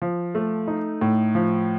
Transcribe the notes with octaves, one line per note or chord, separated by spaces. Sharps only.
F3
A3
D#4
A2
F3